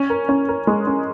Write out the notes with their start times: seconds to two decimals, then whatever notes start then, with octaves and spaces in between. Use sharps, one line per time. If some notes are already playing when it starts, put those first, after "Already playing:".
Already playing: C#4
0.10 A#4
0.29 C#4
0.49 A#4
0.67 G#3
0.87 C#4